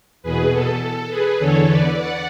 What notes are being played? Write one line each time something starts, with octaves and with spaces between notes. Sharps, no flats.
E2 B2 G#4 B4
A4
A4
G#4 B4
E2 D3 A4 C#5
B4 D5
D5 F#5